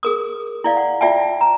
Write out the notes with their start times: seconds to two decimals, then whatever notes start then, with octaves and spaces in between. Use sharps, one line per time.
0.03 G#4 A#4 D#6
0.64 E4 D5 F5
0.77 F#5
1.01 F4 D5 E5 G5 A5
1.41 A#5